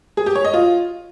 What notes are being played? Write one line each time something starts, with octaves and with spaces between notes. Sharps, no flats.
G#4
G4
C#5
D#5
F4